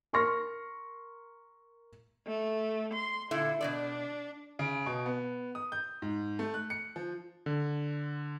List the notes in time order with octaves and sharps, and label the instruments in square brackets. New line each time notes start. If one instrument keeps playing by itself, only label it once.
[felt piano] A#4 C6 C#6 F6 A#6
[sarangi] A3
C6
[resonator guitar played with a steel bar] A#2 D3 E4 [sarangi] A4
[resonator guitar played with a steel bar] B2 F3 D5 [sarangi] D4
[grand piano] C#3
B2
B3
D#6
G6
G#2
A3
F#6
C#7
F3
[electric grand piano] D3